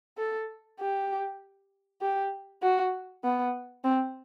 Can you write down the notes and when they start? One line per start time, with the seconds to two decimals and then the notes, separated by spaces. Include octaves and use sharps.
0.18 A4
0.79 G4
2.01 G4
2.62 F#4
3.24 B3
3.84 C4